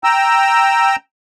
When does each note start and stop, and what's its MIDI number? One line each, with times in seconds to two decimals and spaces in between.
0.04 0.96 79
0.04 0.96 82
0.04 0.96 88